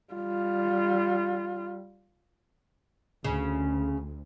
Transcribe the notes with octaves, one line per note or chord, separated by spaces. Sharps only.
G3 F4
D2 C#3